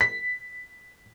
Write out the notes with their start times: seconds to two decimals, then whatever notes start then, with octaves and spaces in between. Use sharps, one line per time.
0.01 B6